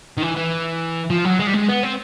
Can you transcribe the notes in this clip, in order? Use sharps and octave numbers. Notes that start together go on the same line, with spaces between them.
D#3
E3
E3
F3
F#3
G#3
G3
G#3
B3
C4